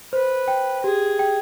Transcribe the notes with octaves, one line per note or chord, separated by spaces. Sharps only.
B4 C5
G5
G4 G#4
G5